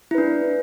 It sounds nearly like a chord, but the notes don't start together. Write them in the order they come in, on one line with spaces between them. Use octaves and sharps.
E4 B4 D4